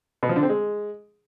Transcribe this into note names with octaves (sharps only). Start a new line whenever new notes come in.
B2
F3
D3
C4
G#3